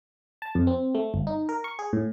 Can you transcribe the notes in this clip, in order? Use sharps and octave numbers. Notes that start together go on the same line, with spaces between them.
A5
F2
C4
A3
G1
D#4
A#4
C#6
G#4
A2